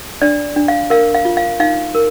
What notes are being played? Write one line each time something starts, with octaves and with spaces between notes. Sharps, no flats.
D4 D5
D4
F5
A#4 F5
F5
F4
F5
D#4 F5
A#4